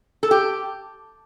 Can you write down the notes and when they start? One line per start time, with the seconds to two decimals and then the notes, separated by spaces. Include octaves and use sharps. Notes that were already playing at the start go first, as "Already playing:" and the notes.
0.23 A4
0.31 G4